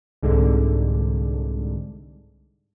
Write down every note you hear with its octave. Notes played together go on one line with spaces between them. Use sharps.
C2 G#2 D3